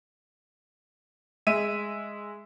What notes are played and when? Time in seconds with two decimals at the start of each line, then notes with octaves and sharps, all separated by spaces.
1.47 G#3 E5 D#7